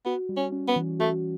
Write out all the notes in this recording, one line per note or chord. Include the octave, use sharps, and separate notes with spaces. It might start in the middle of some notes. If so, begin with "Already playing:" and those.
B3 F#4
G3
C#4
C#4
B3
E3
A3 F#4